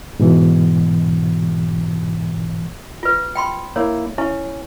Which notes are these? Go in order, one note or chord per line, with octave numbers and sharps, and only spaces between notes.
G#2 B2 E3
F4 B4
G5 B5 C6
A#3 E4 C#5
C#4 E4